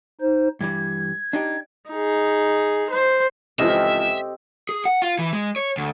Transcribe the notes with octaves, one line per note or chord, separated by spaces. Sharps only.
D#4 C5
G2 E3 G3 G#6
D4 D#4 G4
D#4 G#4
C5
C#2 E3 F3 C4 G4 A4 D#5 E5
G#4
F#5
F4
E3
G#3
C#5
D2